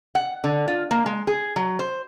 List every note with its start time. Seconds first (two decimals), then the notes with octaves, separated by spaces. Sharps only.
0.15 F#5
0.44 D3
0.68 F4
0.91 A#3
1.06 G#3
1.27 G#4
1.56 F#3
1.79 C5